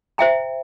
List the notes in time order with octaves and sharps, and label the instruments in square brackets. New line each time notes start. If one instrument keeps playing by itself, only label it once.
[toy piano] C5 E5 G5 A#5